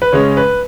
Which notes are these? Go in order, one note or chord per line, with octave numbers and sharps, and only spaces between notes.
B4
C#3 G#3 C#4 C#5
B4